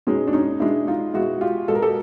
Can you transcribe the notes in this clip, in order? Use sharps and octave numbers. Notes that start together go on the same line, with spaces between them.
B2 G#3 C#4 D#4
D4
C#4 D#4
B2 G#3 D4 E4
D#4 F4
B2 G#3 E4 F#4
F4 G4
B2 G#3 A4
A#4
G4 A4